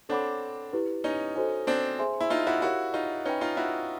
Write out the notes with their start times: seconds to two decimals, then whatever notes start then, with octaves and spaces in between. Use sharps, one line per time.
0.09 C4 D4 A4 C#5 F#5 B5 D6
0.73 E4 G4 B4
1.04 C#4 D#4
1.36 F#4 A4 C5 D#5 G#5
1.67 C4 D4
1.99 G#4 C5 E5 G#5 C6
2.20 E4
2.30 D#4 F4
2.47 E4 F#4
2.62 E4 F#4 G4 A#4 C#5 F5
2.94 D#4 F4
3.25 C#4 D#4 B4 E5 G5 B5
3.41 D#4 F4
3.57 E4 F#4